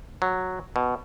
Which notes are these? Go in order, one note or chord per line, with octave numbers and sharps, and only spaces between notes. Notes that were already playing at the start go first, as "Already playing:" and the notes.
F#3
B2